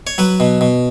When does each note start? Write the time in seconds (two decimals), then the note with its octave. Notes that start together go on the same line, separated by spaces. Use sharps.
0.07 C#5
0.18 F#3 B4
0.40 B2
0.61 B2